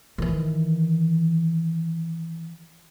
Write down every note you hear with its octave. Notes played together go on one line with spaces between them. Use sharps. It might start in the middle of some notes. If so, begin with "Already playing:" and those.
D#3 E3